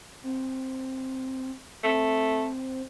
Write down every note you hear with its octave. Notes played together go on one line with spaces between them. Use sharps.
C4
A3 C4